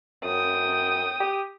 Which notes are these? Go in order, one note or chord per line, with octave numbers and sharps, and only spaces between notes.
F#2 G5 D#6
G4